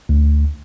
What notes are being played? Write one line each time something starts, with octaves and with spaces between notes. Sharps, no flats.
D2